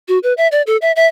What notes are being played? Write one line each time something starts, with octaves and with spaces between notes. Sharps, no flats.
F#4
B4
E5
D5
A4
E5
E5